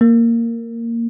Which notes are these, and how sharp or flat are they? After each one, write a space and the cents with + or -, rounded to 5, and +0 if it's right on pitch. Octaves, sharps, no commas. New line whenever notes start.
A#3 -10